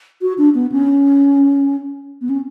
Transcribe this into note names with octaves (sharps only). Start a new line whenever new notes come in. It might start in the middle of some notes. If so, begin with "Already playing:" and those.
F#4
D4
B3
C#4
B3
C#4